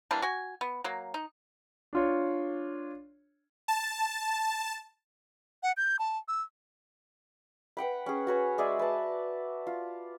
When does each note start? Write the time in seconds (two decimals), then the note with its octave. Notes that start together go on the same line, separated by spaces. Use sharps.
0.11 E3 G3 A#3 D4
0.22 F#4 G#5
0.61 B3
0.84 F#3 A#3
1.14 D#4
1.93 D4 F4 C#5
3.68 A5
5.63 F#5
5.77 G6
5.99 A5
6.28 E6
7.77 B4 F#5 G5 B5
8.06 C#4 G#4
8.27 F#4 B4 C#5
8.58 G#3 G#4 D5 E5
8.79 B4 A5
9.67 F4